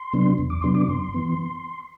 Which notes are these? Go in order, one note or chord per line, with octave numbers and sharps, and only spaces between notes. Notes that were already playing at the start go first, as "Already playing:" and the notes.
Already playing: C6
C3 F#3 B3 D4
E2
D6
C3 F#3 B3 D4 C6
D6
F#2 C6
E3 B3